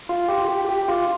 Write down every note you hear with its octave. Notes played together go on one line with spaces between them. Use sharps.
F4
G4
G4
G4
F4